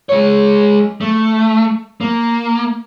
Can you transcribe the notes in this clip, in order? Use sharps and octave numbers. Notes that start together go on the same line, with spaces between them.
G#3 C#5
A3
A#3